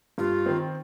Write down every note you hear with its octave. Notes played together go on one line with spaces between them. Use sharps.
G2 F4
D#3 C4